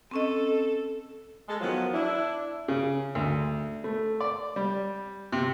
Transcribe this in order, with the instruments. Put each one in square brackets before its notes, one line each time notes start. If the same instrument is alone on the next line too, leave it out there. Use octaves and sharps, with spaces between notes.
[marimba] C4 C#4 D#5 [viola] A4
[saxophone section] G#3 A4
D#3 F3 F#3 B3
D4 E4
[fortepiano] C#3
D2
A3
D5
G3
C3